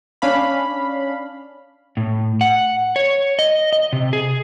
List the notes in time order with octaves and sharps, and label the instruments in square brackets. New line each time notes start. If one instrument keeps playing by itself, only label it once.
[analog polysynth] C#4 D4 F5 B5
[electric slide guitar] A2
F#5
C#5
D#5
D#5
C3
G#4